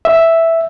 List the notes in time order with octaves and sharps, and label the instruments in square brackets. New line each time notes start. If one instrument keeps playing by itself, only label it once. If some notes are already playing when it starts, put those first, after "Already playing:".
[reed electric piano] E5